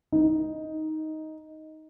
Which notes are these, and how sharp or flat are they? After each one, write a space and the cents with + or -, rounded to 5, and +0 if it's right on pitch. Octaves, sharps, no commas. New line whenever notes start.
D#4 +10